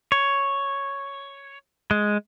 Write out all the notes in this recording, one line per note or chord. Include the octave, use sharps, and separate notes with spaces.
C#5
G#3